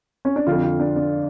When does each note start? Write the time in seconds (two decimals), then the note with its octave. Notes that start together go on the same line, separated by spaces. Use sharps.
0.25 C#4
0.36 D4
0.47 F2 D3 F4
0.64 F4
0.80 D4
0.96 D4